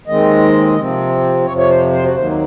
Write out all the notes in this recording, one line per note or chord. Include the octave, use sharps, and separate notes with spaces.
D#2 D#3 G#3 C4 D#5
C3 F3 C4
F2 C3 F3 C#5
C#5
C5
C5
F#4
D#2 D#3 F#3 A#3 C5